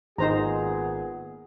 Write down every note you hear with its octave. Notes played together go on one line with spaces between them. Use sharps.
G#1 A#2 B3 D#4 G#4 C5 A#5